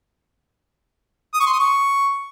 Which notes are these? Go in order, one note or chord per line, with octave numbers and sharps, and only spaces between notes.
D#6
C#6
C6
D#6
C#6